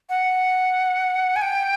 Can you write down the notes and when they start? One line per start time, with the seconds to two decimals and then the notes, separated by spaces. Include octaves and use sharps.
0.09 F#5
1.36 G#5
1.42 G5